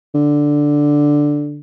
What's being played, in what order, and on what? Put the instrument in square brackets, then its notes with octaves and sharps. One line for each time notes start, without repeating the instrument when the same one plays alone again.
[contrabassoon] D3